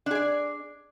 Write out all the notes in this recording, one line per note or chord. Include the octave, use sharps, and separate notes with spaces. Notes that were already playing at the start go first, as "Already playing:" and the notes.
D4 G#4 D5